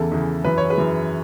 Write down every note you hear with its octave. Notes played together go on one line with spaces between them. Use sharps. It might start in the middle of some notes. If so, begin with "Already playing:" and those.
Already playing: E2 C#3 E3 A4
E2 C#3 E3
F#2 E3 B4
C#5
G#4 B4
F#2 E3